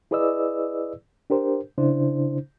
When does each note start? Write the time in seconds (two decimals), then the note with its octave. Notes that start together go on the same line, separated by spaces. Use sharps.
0.11 E4 G#4 B4 D5 D#5 E6
1.30 D4 G4 A#4 C5
1.78 C#3 D4 E4 C5